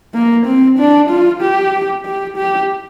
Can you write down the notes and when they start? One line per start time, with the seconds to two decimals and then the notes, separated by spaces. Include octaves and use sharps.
0.14 A#3
0.46 C4
0.78 D4
1.10 F4
1.41 G4
2.05 G4
2.37 G4